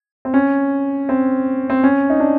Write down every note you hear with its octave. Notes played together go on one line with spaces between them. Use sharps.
C4
C#4
C4
C4
C#4
D#4
D4